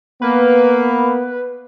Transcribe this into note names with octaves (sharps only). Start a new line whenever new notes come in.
A#3 B3 B4